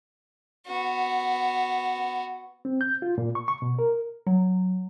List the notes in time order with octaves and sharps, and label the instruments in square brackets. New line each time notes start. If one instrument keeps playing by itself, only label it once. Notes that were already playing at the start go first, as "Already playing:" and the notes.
[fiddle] B3 F#4
[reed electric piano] C4
G6
F4
A#2
C#6
C#6
B2
A#4
[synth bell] F#3